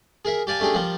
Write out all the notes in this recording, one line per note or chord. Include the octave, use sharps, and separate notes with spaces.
G#4 A#4 E5
G4 D5 F5 G#5 A5
A3 C#4 D4 G4 G#4
F3 G3 A#3